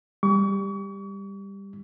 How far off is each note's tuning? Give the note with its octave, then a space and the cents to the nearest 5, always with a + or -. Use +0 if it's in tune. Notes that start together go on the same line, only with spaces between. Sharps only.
G3 +10 C#6 +40